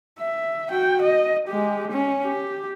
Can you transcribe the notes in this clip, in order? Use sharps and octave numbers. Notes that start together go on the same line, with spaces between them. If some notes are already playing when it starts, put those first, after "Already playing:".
E5
F#4 G5
D#5
G#3 G4
C#4
G4